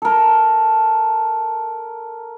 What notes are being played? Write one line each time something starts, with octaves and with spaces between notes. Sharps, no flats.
A4 A#4